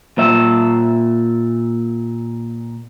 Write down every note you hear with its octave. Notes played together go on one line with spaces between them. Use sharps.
A#2 E5